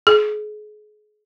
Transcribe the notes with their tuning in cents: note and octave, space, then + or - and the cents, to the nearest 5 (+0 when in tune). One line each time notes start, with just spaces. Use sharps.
G#4 +30